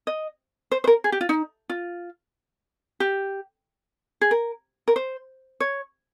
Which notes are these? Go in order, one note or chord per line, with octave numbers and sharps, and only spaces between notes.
D#5
C5
C5
A#4
G#4
G4
F4
D#4
F4
G4
G#4
A#4
A#4
C5
C#5